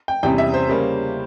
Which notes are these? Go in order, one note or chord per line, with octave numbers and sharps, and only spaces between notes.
G5
E2 C3 G3 C#4 G5
E5
C5
C#3 G3 A#3 C#4